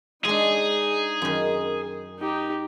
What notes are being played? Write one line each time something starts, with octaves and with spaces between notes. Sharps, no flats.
G#3 D4 D#4 G#4
F#2 D#3
D#4 G4